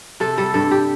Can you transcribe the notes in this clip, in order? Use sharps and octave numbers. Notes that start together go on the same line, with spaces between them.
C3 A4
G3 A4
G2 A4
G4